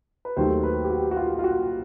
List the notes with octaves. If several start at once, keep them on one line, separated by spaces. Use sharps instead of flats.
B4
D#2 D#3 F#3 A3 C5
B4
G4
F#4
F#4
F4
F4
F#4